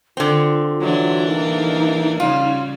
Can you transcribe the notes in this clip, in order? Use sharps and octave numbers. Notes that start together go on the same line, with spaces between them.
D3 C4 F4
G#2 E3 F#3 D4
C2 A2 A#3 D#4
C#3 G3 F4